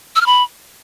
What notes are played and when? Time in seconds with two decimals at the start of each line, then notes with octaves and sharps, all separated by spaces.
0.16 E6
0.21 F6
0.26 B5